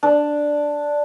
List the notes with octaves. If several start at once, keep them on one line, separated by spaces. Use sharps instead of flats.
D4